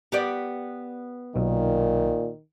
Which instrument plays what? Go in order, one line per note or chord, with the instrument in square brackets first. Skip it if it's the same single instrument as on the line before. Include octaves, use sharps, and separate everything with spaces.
[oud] B3 G4 D5
[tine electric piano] B1 [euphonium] A#2 [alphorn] D#3